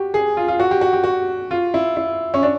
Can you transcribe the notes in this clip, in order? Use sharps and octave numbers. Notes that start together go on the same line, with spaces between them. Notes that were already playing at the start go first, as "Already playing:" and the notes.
Already playing: F#4 G4
G#4
F4
F4
F#4
G4
F#4
G4
F#4
F4
E4
E4
C#4
D4